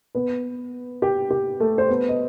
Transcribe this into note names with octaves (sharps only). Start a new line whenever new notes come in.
B3 B4
G4
G4
A3 A4
C5
B3 B4
D#5